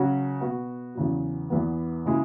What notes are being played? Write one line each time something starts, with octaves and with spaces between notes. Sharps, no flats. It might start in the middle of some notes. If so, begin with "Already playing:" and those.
Already playing: C#3 F#3 C#4 F#4
B2 B3 F#4
E2 C#3 F#3
E2 E3 B3
C#3 G#3 E4 G#4